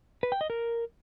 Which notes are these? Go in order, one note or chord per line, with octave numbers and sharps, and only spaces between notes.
B4
G5
D#5
A#4